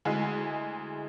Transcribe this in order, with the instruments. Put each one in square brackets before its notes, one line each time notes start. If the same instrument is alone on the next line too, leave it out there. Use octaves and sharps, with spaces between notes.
[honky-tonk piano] D2 G#3 E4 G#5